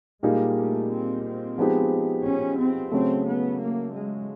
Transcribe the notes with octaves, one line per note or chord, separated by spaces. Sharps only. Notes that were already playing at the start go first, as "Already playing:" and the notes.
A#2 G3 G#3 A#3 D#4 G#4
A3
C4
C4
F3 G#3 B3 D#4 G4
C#4
C4
C#3 F#3 A3 C4
B3
A#3
G#3